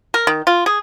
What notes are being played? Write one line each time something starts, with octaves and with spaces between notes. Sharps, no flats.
A#4
D#3
F4
G#4